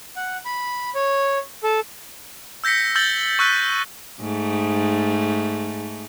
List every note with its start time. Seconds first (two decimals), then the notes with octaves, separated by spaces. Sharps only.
0.16 F#5
0.45 B5
0.95 C#5
1.63 A4
2.64 E6 G6 A#6 B6 C#7
2.96 E6 G6 A6 F#7 G7
3.39 C#6 E6 F#6 B6 D#7
4.20 G#2 A3